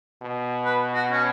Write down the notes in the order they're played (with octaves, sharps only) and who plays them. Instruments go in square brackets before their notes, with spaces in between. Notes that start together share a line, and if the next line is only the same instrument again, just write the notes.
[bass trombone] B2
[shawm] B4
F#4
C#4